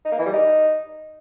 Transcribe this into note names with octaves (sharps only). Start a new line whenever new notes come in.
D#4
A#3
E3
G3
D#4